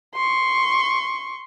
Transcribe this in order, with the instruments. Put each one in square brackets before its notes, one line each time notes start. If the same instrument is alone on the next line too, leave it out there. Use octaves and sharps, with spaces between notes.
[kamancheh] C6 C#6